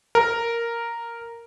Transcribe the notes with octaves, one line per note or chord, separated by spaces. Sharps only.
A#4